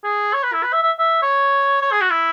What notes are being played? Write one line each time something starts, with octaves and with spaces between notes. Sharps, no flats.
G#4
C#5
B4
E4
B4
E5
E5
E5
C#5
C#5
G#4
F#4
E4